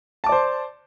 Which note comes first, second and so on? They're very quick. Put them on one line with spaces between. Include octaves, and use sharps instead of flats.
A5 D6 D5 C5